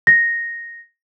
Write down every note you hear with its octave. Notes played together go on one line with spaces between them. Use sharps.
A#6